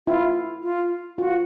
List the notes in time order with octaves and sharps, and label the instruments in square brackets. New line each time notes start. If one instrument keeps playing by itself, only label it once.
[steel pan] E4 [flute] F4
[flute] F4
[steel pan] F4 [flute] F#4